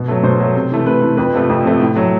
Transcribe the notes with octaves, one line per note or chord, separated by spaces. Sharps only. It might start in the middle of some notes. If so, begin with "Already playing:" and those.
Already playing: B2
F#3 A3
B2 C5
F#3 A3
C3
E3 A3
C3 B4
E3 A3
F2 B4
C3 F3 A3
F2
C3 F3 A3
A2
F#3 A3